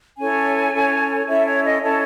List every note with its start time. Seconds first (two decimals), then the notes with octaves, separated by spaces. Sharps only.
0.18 C#4 E4 A4 C#5 G#5
0.74 C#4 E4 A4 C#5
1.27 C#4 E4 A4 C#5 E5
1.46 C#5
1.64 D#5
1.81 C#4 E4 A4 C#5 A5